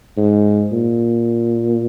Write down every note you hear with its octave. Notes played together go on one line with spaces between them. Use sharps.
G#2
A#2